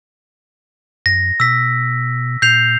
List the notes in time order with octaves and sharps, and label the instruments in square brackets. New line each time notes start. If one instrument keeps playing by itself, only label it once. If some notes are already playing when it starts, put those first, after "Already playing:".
[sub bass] F#2 [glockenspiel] A#6
[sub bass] B2 [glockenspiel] E6 B6
[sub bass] A#2 [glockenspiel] G6 C7 F7